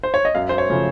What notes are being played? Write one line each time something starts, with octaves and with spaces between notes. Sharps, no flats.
C5
C#5
D#5
F#2 F5
C5
C#5
C#3 F3 A3